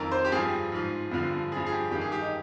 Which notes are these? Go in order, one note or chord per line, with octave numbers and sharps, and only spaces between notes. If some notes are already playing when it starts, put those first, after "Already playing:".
Already playing: F2 D#3 A#4
C5
G4
G2 F3 G#4
G#2 F3
G2 D3 F3
G2 F3 G#4
G#4
G4
G2 D#3 G4
G#4
G4
D#4